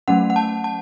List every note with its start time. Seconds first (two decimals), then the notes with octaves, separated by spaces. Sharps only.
0.08 F#3 A3 C#4 F#5
0.30 F#5
0.36 A5
0.64 A5